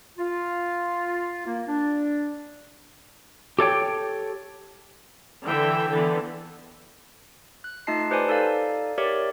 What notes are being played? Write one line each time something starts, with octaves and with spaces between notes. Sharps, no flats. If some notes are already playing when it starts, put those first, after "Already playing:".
F4
A#3
D4
G4 A4 C#5 G5
D3 E3 E5 G5
D3 E3 B3
F#6
A3 D#4 F4 D#5 A5 C7
G4 B4 C5 D5 G#5 A5
D#4 A4 D5 F5
G4 A#4 C#5 D5 E5